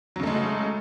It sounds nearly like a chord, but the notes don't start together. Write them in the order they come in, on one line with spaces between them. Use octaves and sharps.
F#3 C#3 A3 G#3